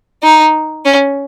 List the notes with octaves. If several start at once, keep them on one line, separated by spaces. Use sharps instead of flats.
D#4
C#4